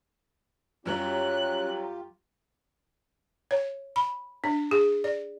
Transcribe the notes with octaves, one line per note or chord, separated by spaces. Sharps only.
F#2 F#3 G3 C#4 F4 G4 F#6
C#5
B5
D4
G#4
D5